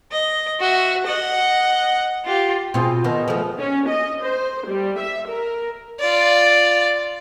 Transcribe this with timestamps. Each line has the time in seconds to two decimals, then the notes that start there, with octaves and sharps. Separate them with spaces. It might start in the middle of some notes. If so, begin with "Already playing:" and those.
0.12 D#5
0.60 F#4 E5
1.06 D#5 F#5
2.26 F4 G4
2.74 B2 C4 F4 G#4
3.04 B2 D#3
3.28 F3 A3
3.59 C#4
3.88 D#5
4.23 C5
4.68 G3
4.99 E5
5.29 A#4
6.00 F4 D5